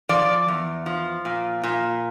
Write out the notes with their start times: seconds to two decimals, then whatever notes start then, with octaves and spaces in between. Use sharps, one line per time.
0.09 F3 D5
0.48 E2
0.86 F3
1.25 A#2
1.64 A#2